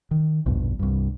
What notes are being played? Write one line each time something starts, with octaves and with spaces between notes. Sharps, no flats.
D#3
A#1 E2 G2 B2
C2 G2